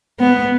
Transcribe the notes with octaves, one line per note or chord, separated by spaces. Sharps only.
B3